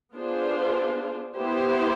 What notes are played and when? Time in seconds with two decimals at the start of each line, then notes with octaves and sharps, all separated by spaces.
0.14 B3 D4 F4 G#4 C5
1.36 B3 E4 G4 C5